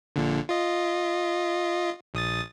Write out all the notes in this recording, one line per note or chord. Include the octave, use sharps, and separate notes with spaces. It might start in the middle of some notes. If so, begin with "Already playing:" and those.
A#1 A#2 D3
F4 D#5
A#1 D#6 A6